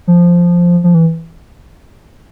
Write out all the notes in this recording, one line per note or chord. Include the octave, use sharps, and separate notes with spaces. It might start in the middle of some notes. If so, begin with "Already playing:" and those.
F3
F3
E3